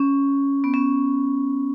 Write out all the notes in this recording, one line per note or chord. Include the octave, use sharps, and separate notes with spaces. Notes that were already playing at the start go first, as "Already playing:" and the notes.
Already playing: C#4
B3
C#4